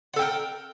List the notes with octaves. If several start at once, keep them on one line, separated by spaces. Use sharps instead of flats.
A4 A#4 F#5 G5